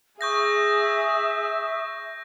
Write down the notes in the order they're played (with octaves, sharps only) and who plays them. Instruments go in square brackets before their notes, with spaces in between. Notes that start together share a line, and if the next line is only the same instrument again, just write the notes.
[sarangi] G#4 [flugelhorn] E5 [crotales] C#6 G6 A#6 [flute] D#6